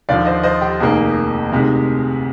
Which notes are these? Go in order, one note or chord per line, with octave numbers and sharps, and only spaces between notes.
D#2 D3 F3 D5 F5
C5 D#5
C5 D#5
G4
F1 F2 D#3 A#3 G#4
D2 C3 D#3 G#3